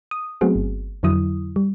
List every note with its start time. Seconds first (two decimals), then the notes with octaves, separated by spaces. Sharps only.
0.11 D#6
0.41 F#3 A3 B3 C4 F#4 G#4
0.56 G1
1.03 F2 D3 F#3 E4 D#6
1.56 G3